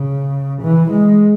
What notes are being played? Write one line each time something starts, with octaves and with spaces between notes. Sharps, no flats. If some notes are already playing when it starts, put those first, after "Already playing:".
Already playing: C#3
E3
G#3